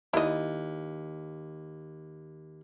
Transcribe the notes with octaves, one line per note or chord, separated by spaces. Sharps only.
D#2 E4 D#5